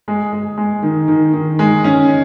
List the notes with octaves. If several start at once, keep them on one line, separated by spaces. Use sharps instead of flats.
G#3
G#3
G#3
D#3
D#3
D#3
G#3
C#4